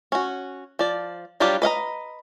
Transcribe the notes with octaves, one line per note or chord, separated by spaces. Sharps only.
C#4 F#4
F3 D5
F#3 G3 D4 F4 G4
B4 D#5 F5 A#5